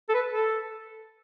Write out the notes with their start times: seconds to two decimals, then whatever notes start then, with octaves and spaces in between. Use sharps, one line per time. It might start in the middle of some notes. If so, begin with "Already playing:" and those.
0.09 A4
0.14 B4
0.34 A4